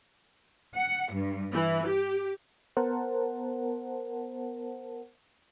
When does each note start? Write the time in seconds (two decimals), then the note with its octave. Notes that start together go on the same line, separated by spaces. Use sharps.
0.76 F#5
1.13 G2
1.53 E3
1.87 G4
2.77 B3 A#4 C5 F#5 A5